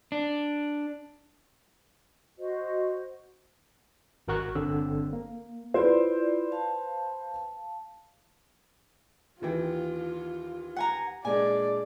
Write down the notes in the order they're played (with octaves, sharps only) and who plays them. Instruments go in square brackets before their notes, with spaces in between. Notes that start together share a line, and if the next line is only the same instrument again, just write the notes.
[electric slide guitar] D4
[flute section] F#4 C5 D#5
[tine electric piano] G#1 F#4 A#4 F#5 C#6 F#6
G1 D3 C4 E6
A#3
[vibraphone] E4 F4 D5 [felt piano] B4 C5
[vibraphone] F5 A5
[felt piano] D#2 E3 G5 [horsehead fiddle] F4
[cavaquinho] F#5 G#5 A#5
[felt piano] A#2 G#3 D4 [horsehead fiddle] D5 [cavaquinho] G#5